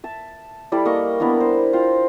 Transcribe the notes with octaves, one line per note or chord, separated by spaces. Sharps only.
E5 A5
G3 E4 A4 D5
A#3 D#5 C#6
B3 D4 E4 A#4
C5
F4 C5 G5